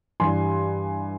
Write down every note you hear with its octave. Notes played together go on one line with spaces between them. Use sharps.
G2 E3 G3 G#5 C6